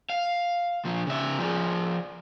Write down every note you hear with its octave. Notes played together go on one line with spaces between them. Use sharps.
F5
A#2 F3
C#3 E5
F3 G#4